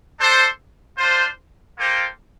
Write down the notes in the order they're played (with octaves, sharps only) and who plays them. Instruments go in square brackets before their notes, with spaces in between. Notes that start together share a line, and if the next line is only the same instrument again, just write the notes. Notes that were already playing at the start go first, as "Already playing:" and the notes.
[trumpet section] D4 A4 C5
D4 F4 C5
A#3 F4 A4 C5 G5